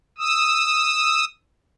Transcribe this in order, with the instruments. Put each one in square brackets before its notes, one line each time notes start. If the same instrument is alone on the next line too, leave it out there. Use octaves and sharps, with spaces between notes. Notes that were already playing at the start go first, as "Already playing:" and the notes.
[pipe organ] D#6 E6